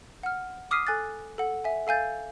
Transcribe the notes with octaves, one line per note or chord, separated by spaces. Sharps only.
F#5 F6
D6 D#6 F6 B6 C7 D#7
A4 G#5 F#6 A6
A4 F#5
E5 G#5
A4 F5 G#5 G6 A6